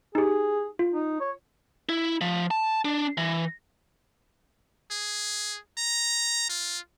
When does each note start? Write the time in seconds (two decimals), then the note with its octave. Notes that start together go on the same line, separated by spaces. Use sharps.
0.15 D#4 G4 G#4
0.79 F4
0.93 D#4
1.21 C#5
1.89 E4
2.21 F3
2.51 A5
2.85 D4
3.18 E3
4.91 G#4
5.78 A#5
6.50 F4